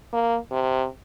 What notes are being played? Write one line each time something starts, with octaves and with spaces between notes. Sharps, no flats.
A#3
C3